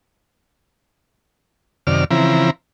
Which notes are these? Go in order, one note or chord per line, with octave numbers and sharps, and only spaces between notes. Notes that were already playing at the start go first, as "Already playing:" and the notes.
F#2 C3 D#3 D5 F6
C#3 E3 F3 C4 E4 A#5